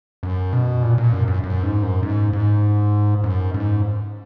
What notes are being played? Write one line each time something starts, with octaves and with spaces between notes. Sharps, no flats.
F#2
B2
A#2
A#2
F#2
F#2
F#2
G#2
F#2
G#2
G#2
F#2
G#2